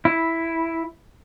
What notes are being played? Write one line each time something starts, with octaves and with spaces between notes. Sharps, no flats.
E4